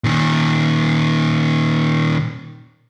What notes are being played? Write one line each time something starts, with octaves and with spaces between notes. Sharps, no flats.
A#2 D#3